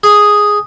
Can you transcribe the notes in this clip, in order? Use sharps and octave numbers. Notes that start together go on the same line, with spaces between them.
G#4